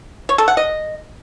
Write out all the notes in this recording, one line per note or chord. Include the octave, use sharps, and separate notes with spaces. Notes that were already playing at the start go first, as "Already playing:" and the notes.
C#5
A4
F#5
D#5